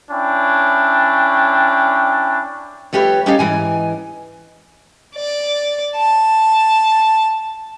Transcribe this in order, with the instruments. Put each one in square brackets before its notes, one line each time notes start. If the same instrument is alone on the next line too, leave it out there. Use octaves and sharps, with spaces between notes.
[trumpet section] C#4 D4 E4 G5
[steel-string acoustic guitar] F2 A3 G4 B4 C#5
C#4 D#4 G4 A4 C#5 F5
G#2 E3 G#5
[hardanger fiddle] D5
A5